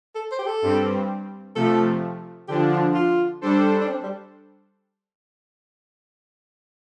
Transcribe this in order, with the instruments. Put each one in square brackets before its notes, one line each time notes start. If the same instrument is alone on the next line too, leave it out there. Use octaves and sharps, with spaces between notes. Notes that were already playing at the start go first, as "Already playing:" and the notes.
[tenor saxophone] A4
C5
G4
A4
[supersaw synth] G2 G3 C4
[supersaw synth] C3 F3 A3 [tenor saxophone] A4
[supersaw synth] D3 F3 D4 [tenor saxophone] G4
[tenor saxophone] F4
F4
[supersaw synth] G3 D4 A4 C5
[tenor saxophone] D4
C4
G3